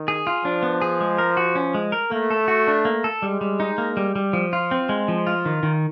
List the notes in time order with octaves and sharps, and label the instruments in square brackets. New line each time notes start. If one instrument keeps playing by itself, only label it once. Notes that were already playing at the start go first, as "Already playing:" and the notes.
Already playing: [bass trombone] D#3
[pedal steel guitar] G#4
F4
[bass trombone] F3 [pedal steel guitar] D4
[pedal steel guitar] B3
G#4
G#3
A#4
F#4
C#4
G#3
A#4
[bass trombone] A3 [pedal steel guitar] A#3
[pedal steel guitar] A4
F#4
D4
A#3
A4
[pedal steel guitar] G3 [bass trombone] G#3
[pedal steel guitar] G3
D#4
A#3
G3
G3
F3
F4
C4
G#3
F3
F4
D#3
D#3